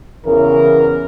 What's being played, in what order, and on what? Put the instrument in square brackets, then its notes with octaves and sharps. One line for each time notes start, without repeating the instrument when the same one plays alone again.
[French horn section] E2 C#3 E3 A#4